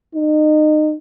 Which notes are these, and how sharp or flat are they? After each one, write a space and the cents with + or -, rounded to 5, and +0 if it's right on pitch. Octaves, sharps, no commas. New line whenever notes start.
D#4 -25